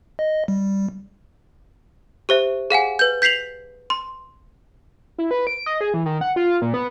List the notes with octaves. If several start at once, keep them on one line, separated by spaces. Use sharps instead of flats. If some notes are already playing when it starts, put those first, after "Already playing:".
D#5
G3
G4 C5 E5
G#4 F5 F#5 G#5
B4 G6
G6 B6 C7 F7 F#7
C6
E4
B4
D7
D#5
G#4
E3
D#3
F#5
F4
A#2
B3